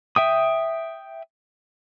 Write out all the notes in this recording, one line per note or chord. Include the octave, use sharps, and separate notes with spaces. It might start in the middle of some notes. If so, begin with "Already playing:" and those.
E5 G5 D#6